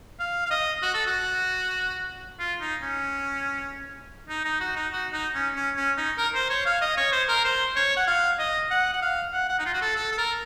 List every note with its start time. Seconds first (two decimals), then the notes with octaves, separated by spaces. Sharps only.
0.20 F5
0.46 F5
0.51 D#5
0.82 F#4
0.94 A4
1.07 F#4
2.40 F4
2.61 D#4
2.82 C#4
4.29 D#4
4.45 D#4
4.60 F#4
4.76 D#4
4.93 F#4
5.13 D#4
5.35 C#4
5.55 C#4
5.77 C#4
5.97 D#4
6.18 A#4
6.34 C5
6.50 C#5
6.66 F5
6.81 D#5
6.97 C#5
7.12 C5
7.28 A#4
7.45 C5
7.76 C#5
7.97 F#5
8.07 F5
8.39 D#5
8.71 F#5
8.93 F#5
9.02 F5
9.33 F#5
9.49 F#5
9.59 D#4
9.66 F4
9.74 F#4
9.81 A4
9.97 A4
10.12 A4
10.18 A#4